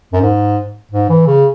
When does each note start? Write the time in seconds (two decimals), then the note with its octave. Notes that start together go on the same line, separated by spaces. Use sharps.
0.13 F#2
0.21 G#2
0.91 G#2
1.09 E3
1.27 C#3